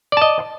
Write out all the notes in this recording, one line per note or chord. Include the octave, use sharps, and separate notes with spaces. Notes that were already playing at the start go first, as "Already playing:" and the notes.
D5 D#5 A5